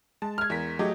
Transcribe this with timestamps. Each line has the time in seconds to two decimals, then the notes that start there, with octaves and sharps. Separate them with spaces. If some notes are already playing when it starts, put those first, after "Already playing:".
0.22 G#3 A5
0.38 F6 G#6
0.50 E2 A#4 B6
0.79 F#3 A3 G4 G#4 D#5